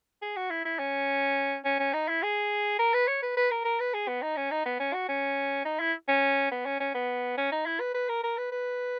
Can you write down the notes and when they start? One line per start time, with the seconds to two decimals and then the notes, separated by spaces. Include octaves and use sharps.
0.22 G#4
0.36 F#4
0.50 E4
0.65 E4
0.79 C#4
1.65 C#4
1.80 C#4
1.93 D#4
2.08 E4
2.22 G#4
2.79 A#4
2.94 B4
3.08 C#5
3.22 B4
3.37 B4
3.51 A#4
3.65 A#4
3.80 B4
3.94 G#4
4.08 B3
4.22 D#4
4.37 C#4
4.51 D#4
4.65 B3
4.80 C#4
4.94 F#4
5.09 C#4
5.65 D#4
5.80 E4
6.08 C#4
6.51 B3
6.66 C#4
6.80 C#4
6.94 B3
7.37 C#4
7.52 D#4
7.66 E4
7.80 B4
7.94 B4
8.09 A#4
8.23 A#4
8.38 B4
8.52 B4